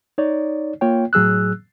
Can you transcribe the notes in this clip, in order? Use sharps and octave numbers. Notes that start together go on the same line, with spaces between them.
D#4 C#5 D5
A#3 F4 C#5 G5
A2 F#3 G#4 E6 F#6